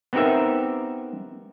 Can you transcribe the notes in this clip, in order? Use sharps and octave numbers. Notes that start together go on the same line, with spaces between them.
B3 C4 D#4 G4 A#4 E5